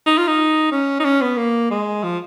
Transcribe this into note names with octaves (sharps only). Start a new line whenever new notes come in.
D#4
F4
D#4
C#4
D#4
C#4
B3
A#3
G#3
F3